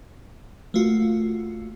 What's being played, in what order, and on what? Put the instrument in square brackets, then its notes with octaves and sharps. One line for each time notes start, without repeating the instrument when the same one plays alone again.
[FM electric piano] A3 A#3 F4 F#4